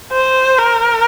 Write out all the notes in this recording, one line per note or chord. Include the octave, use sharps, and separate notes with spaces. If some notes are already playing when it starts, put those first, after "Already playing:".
C5
A#4